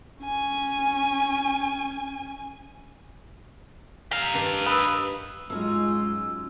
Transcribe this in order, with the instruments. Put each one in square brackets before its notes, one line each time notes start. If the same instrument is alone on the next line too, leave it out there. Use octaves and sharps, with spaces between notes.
[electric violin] C#4 G#5
[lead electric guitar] G4 F5 [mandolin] A#5
[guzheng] G2 D#3 D4
[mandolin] B4 [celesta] D#6 E6
[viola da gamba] G#2 F4 [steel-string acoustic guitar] F#3 C#4 D#4 [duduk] G#3 [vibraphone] E6